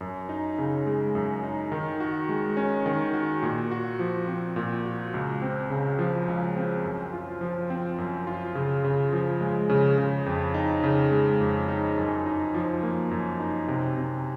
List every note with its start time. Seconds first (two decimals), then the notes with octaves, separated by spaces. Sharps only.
0.01 F#2
0.29 D#4
0.58 C#3
0.86 G#3
1.15 F#2
1.44 D#4
1.72 D#3
2.00 F#4
2.29 G#3
2.57 C#4
2.86 D#3
3.14 F#4
3.42 A#2
3.71 F#4
3.99 F3
4.28 C4
4.56 A#2
4.85 F#4
5.14 C#2
5.42 C4
5.70 C#3
5.99 F3
6.28 C#2
6.56 C4
6.84 F#2
7.13 F4
7.41 F3
7.70 C4
7.98 F#2
8.27 F4
8.55 C#3
8.84 C#3
9.13 F3
9.41 G#3
9.69 C#3
9.98 C#3
10.26 F2
10.54 D#4
10.83 C#3
11.12 G#3
11.40 F2
11.68 D#4
11.98 F#2
12.26 D#4
12.54 F3
12.83 A#3
13.11 F#2
13.40 D#4
13.68 C3
13.97 C3